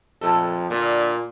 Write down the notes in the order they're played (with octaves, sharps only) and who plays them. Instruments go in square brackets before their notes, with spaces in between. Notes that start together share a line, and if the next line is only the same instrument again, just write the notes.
[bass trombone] F2 [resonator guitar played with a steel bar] A#2 A3 A4
[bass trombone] A#2 [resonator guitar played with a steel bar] D3 G3